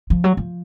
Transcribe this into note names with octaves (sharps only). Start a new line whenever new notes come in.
F3
F#3
F3